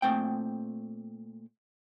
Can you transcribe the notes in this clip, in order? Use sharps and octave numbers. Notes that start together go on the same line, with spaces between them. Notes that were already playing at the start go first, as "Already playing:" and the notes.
A#2 A3 C4 G5